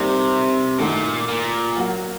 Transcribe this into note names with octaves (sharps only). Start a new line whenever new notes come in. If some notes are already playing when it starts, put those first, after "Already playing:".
Already playing: C3 G3 A#3 D#4 G4
A#2 D#3 A3 D#4 F#4
A#2
F#3 A#3 F#4